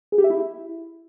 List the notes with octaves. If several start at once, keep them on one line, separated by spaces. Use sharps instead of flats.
G#4
G4
E5
E4